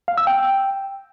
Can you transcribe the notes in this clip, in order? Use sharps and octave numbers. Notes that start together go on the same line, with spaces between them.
F5
E6
G5